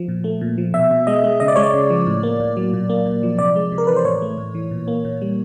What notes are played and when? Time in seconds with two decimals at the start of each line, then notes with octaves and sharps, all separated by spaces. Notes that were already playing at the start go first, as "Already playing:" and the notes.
Already playing: F3
0.08 A#2
0.24 A3
0.41 A#2
0.58 F3
0.74 B2 E5
0.91 B2
1.07 G#3 D#5
1.24 G#3
1.40 C#3 D#5
1.48 D5
1.56 G#3 C#5
1.63 D5
1.74 C#3
1.90 F3
2.07 A2
2.23 A#3
2.40 A2
2.57 F#3
2.73 A#2
2.89 A#3
3.06 A#2
3.23 F3
3.39 C3 D5
3.56 G#3
3.72 C3
3.78 A#4
3.87 E3 B4
3.96 C5
4.05 A2 C#5
4.22 A3
4.38 A2
4.55 E3
4.71 A#2
4.88 A#3
5.05 A#2
5.22 G3